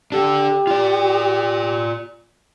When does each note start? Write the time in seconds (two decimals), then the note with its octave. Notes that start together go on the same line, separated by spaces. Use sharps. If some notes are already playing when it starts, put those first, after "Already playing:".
0.12 D4 G4 A4
0.67 F4 D5